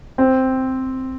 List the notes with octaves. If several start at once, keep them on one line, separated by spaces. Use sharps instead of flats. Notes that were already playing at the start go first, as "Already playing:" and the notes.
C4